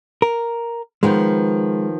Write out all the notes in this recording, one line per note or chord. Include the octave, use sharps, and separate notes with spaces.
A#4
D#3 F3 G#3 B3